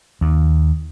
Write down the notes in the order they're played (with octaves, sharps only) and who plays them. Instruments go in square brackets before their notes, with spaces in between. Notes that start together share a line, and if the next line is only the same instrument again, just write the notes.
[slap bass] D#2